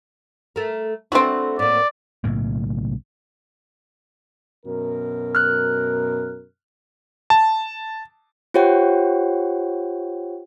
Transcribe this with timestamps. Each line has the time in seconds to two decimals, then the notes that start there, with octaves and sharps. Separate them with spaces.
0.56 A3 A#4
1.12 A3 C4 D4 E4 F#4
1.59 A2 A#3 D5
2.24 B1 A2 C#3 A#3
4.66 F#2 B2 A#4
5.35 F6 F#6
7.30 A5
8.54 F4 G4 C5 C#5 F#5 G5